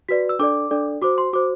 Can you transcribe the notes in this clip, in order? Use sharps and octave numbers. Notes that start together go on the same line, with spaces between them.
F#4 B4 D5 B6
E6
D4 A4 D5 D6
D4 A4 D5
F#4 C5 D6
C6
F#4 C5 D6